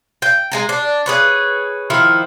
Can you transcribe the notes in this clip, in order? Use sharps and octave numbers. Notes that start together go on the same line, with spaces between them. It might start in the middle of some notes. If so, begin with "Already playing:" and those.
G5
G#3 G#5 A#5
D4
G#4 B4 C#5
D#3 F3 E4